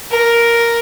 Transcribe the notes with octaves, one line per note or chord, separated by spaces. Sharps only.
A#4